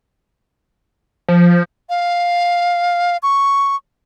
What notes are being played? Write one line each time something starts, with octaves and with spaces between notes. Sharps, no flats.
F3
F5
C#6